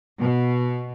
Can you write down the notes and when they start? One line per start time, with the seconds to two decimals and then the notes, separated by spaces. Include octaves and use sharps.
0.18 B2